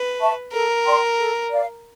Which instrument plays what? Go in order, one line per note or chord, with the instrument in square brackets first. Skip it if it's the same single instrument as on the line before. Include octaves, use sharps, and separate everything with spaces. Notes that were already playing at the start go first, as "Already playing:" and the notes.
Already playing: [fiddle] B4
[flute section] E5 A5 C#6
[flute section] A4 [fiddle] A#4
[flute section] D5 G5 C6
A4
D5 F5